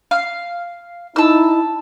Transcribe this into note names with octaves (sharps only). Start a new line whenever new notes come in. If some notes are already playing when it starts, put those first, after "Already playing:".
F5
D#4 E4 A5 E6